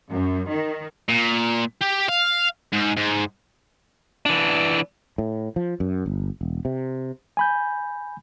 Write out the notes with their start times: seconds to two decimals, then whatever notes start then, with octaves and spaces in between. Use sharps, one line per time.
0.12 F#2
0.50 D#3
1.09 A#2
1.82 G4
2.09 F5
2.73 G#2
2.97 G#2
4.26 E3 D4
5.18 A2
5.56 F3
5.80 F#2
6.06 G1
6.41 E1
6.65 C3
7.37 G#5 B5 G6